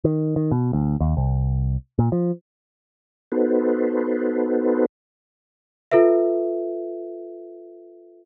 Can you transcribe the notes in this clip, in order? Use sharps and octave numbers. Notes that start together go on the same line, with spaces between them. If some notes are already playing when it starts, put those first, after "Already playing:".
D#3
D#3
B2
D2
D#2
C2
A#2
F3
B3 D#4 F#4 A4 B4 C5
F4 A4 B4 E5